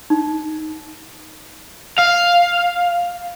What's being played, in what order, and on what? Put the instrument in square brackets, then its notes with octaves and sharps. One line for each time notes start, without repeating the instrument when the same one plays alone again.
[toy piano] D#4
[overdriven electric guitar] F5